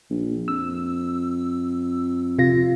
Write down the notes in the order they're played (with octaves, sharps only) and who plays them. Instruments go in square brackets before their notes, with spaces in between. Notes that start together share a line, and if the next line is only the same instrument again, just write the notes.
[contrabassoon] A#1
[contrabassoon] F2 [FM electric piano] E6
[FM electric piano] C3 F4 A#6